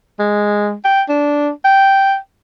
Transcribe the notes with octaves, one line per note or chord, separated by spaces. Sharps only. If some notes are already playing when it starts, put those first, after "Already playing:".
G#3
G5
D4
G5